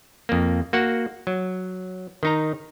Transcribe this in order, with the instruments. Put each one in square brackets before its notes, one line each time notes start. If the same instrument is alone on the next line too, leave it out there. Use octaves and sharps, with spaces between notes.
[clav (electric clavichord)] F2 A#3
A#3 F#4 F#5
F#3
D#3 D#4 A#5